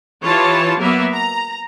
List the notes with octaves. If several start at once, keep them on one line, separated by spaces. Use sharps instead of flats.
E3 F4 G4 C#5 A5
F#3 A#3 B3 A#4 E5
A#5